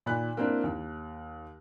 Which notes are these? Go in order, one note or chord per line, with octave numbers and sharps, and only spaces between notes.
A#2 D#3 B5 F#6
A#3 C4 D4 E4
D#2